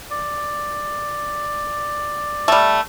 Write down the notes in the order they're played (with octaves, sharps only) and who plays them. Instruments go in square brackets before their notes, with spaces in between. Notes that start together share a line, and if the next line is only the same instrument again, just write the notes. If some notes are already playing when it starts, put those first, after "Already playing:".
[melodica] D5
[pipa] G3 A3